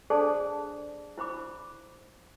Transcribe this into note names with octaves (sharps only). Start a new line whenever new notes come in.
D4 G#4 A4 C5 D5 A5
E4 C5 B5 D6